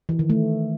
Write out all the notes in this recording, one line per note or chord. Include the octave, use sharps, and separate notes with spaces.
E3
D#3
A3